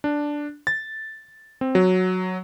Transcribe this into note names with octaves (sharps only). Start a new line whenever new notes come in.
D4
A6
C4
F#3